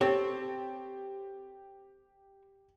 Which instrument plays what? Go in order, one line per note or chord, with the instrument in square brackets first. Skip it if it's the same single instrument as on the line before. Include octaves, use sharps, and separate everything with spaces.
[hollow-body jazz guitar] C4 A4 C#5 [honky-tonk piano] G4